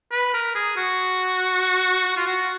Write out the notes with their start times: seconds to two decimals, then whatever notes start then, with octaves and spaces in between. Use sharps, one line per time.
0.11 B4
0.34 A#4
0.55 G#4
0.77 F#4
2.05 F#4
2.16 F4
2.27 F#4